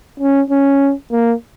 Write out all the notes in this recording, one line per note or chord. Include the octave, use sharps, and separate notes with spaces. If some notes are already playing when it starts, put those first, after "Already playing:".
C#4
C#4
A#3